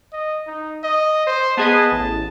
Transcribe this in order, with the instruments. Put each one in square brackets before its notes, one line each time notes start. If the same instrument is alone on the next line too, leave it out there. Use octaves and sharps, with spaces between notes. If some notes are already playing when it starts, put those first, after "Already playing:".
[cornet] D#5
D#4
D#5
C5
[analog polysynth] B3 G#4 D#5 [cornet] A5
[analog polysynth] A1